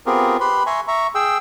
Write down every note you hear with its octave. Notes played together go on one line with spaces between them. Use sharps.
B3 C4 F4 G4 G#4 A#4
G4 B4 B5 C6
E5 G#5 A#5 C6 C#6
E5 A#5 C#6
G#4 G5 E6